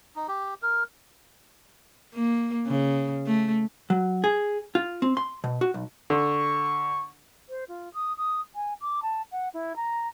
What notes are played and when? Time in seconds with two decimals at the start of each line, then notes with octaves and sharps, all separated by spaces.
0.16 D#4
0.28 G4
0.62 A#4
2.14 A#3
2.67 C#3
3.26 A3
3.90 F#3
4.24 G#4
4.75 F4
5.02 C4
5.17 C6
5.44 B2
5.61 F#4
5.74 B1
6.10 D3 C#6
7.49 C5
7.68 F4
7.94 D#6
8.17 D#6
8.55 G#5
8.81 D6
9.02 A5
9.32 F#5
9.54 E4
9.76 A#5